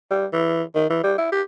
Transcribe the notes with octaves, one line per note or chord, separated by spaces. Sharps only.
G3
E3
D#3
E3
G3
E4
G4